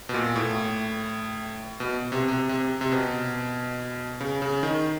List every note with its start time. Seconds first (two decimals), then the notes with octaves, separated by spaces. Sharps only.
0.09 B2
0.14 A#2
0.36 A2
1.80 B2
2.12 C3
2.28 C3
2.49 C3
2.81 C3
2.92 B2
4.21 C#3
4.42 C#3
4.63 D#3